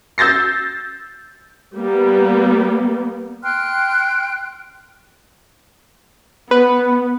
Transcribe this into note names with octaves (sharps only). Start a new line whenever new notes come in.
E6 G6 A6 A#6 C7
G3 A#3 B3
G5 C6 F6 F#6
B3 B4